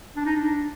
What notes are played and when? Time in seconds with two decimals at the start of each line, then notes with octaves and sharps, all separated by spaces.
0.16 D4
0.26 D#4
0.36 D4